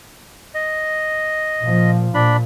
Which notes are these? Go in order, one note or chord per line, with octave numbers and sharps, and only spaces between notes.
D#5
A#2 F3
A#2 D4 B5